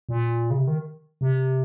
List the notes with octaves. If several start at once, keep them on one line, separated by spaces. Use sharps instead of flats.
A#2
C#3
C3
D#3
C3